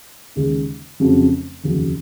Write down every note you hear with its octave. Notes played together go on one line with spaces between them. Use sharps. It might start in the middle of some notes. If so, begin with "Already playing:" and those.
D#2 C#3 G#3
F1 F2 C#3 F#3 C#4
F1 D#2 C#3 F#3